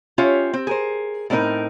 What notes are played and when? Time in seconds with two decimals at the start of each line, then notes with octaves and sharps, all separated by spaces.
0.18 C#4 F4 G4 C#5 E5
0.53 C4
0.67 G#4 A#4 C5
1.30 A2 G#3 C4 D4 D#4 A#4